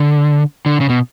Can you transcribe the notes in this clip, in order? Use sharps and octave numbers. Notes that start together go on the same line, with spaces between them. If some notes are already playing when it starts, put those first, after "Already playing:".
Already playing: D3
D3
C#3
B2